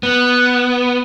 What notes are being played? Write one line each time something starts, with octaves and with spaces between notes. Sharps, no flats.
B3